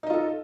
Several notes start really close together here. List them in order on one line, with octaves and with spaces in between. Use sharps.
D#4 D#5 F4 A4